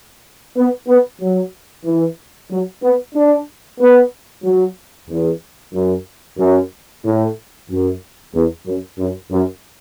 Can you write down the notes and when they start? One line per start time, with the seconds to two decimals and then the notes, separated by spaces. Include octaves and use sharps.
0.57 B3
0.88 B3
1.21 F#3
1.85 E3
2.51 F#3
2.83 B3
3.15 D4
3.81 B3
4.44 F#3
5.10 E2
5.74 F#2
6.39 F#2
7.05 A2
7.70 F#2
8.35 E2
8.67 F#2
8.99 F#2
9.31 F#2